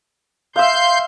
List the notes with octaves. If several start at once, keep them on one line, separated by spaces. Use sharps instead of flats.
E5 F5 C6 G6